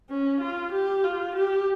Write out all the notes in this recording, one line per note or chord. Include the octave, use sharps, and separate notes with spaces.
C#4
F4
G4
F4
G4